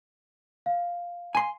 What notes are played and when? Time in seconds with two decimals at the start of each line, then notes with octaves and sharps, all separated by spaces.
0.66 F5
1.35 G#5 C6